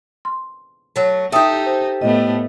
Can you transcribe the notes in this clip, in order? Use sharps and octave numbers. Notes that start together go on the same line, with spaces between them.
C6
F#3 A3
D#4 G4 A4 E5 G5 D#6
C5
A2 A3 B3 D#5